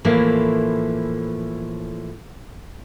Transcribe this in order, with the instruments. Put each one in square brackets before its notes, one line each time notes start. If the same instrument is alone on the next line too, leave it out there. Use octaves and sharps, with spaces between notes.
[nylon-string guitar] A2 E3 F3 A3 A#3